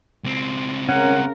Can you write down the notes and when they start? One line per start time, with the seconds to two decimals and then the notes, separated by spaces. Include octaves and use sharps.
0.24 C#2 C4
0.89 C#3 C#4 A#4 F#5